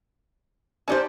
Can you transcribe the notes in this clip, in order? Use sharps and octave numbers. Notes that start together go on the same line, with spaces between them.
C#4 D#4 G4 C5 D5 A5